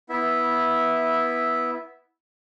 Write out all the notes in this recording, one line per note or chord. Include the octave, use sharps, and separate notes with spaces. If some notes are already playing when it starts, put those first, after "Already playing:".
B3 E4 E5